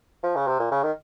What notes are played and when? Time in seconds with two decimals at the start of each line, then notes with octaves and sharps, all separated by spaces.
0.23 F3
0.36 C#3
0.47 C3
0.59 A#2
0.71 C#3
0.83 D#3